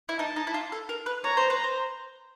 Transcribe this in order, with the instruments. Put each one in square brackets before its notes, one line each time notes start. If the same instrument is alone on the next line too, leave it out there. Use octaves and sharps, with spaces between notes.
[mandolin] E4
[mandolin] D#4 [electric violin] A5
[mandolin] D#4
E4
F4
A4
A#4
B4
[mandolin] C#5 [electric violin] A#5
[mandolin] C5
B4
C5